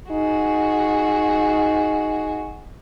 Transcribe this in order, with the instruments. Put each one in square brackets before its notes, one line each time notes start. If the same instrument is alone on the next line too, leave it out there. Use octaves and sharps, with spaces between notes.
[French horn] D#4 [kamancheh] F#4 G#4